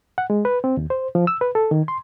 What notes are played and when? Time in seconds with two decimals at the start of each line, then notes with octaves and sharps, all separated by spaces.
0.18 F#5
0.30 G#3
0.45 B4
0.64 C4
0.77 D#2
0.90 C5
1.15 F3
1.27 E6
1.41 B4
1.55 A4
1.71 D#3
1.88 C6